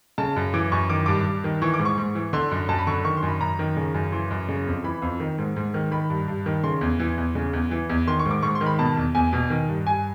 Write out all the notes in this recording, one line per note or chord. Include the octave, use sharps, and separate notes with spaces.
C#3 A5
F#2
E3 D6
F#2 C#6
D#3 D6
G2 D6
G2
D#3
E3 C#6
D6
G#2
C#6
G#2
E3
D3 C6
F#2
F#2 A5
B5
D3 C#6
D#3 C#6
C6
F#2
B5
F#2 A#5
D#3
C#3
F#2
E3 C6
F#2
C#3
F2
E3 B5
F2
D#3
G#2
G#2
D#3
D#3 B5
G2
G2
D#3
C#3 C6
E2
E3
E2
C#3
E2
E3
E2
D#3 C6
C#6
G#2
D6
G#2 C#6
C6
D#3
B5
B2 A5
E2
E2 G#5
B2
D#3
G2
G2 G#5